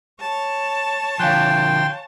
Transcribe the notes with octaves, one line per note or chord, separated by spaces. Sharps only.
C#5 A5
D3 F3 F5 G5 G#5 C6 F#6